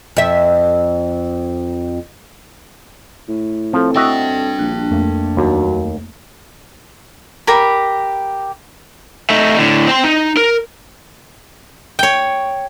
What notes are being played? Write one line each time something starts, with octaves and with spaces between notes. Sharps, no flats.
F2 E5
A2
F3 C4 A4
D4 F#4 D#5 E5 G5
A#1 F#6
F2 A3 A#3
D#2 F#3
G4 A#4 B5
A3 D#4
A2 D3
C4 C6
D#4
A#4
C#5 G5